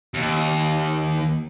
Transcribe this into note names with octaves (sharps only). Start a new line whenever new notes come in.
D#2